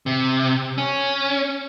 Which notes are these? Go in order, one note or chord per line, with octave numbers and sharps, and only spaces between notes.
C3
C#4